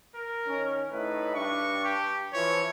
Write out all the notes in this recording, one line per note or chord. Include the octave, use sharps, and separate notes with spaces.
A#4
D#3 C#4
A2 D#4 B4
G2 D4 C#6
G4
E3 F3 C#5